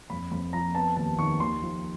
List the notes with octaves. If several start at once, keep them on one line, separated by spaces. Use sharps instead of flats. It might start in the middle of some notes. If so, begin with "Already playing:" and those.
F2 B5
F2 B5
F3 A#5
B3 A5
D#2 A5
D#3 C#6
D#2 C6
F3